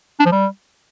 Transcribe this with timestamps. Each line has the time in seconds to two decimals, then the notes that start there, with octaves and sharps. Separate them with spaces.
0.20 D4
0.26 F3
0.32 G3